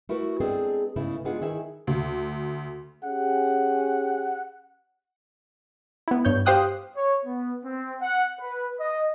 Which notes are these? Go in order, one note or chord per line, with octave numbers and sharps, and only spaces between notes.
A3 E4 F#4 A#4 B4
G#3 B3 C4 D4 G#4 A4
G#2 C#3 G#3 A3 B3 E4
G#3 B3 D4 F4 G#4 F#5
D#3 E4 G#4 A#4 E5 G#5
D2
C#4 G4 G#4 F#5
B3 E4
G2 C#5 G6
G4 C5 F5 G5 D#6 F#6
C#5
B3
C4
F#5
B4
D#5